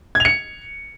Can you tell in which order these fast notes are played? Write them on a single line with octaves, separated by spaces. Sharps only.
G#6 F7 C#7